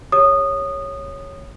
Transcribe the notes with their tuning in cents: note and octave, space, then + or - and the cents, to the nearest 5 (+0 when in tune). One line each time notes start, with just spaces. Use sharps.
G4 +35 C#5 -5 D#6 -15